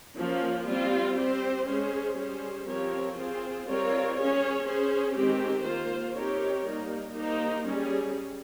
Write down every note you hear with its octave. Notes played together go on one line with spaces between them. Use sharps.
F3 A#3 C#4
G3 C4 F4 C5
C4 G4 C5
G#3 C#4 G#4 C5
G3 C#4 G#4 C5
F3 C4 G4 A#4 C#5
C4 F4 G#4 C5
G3 C4 F4 A#4 C#5
C#4 G#4 C#5
C#4 G#4 C5
D#3 G#3 C4 G4
A#3 F4 C5
C4 D#4 G4 A#4 C#5
G3 A#3 D#4
A#3 D#4 G4 C5
G3 C#4 G#4